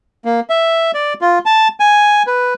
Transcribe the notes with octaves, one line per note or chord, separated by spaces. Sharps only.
A#3
E5
D5
F4
A5
G#5
B4